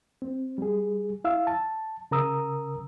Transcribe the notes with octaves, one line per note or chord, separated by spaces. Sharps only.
C4
G3 G#4
E4 F5 E6
A5
C#3 A#4 A#5 D#6 E6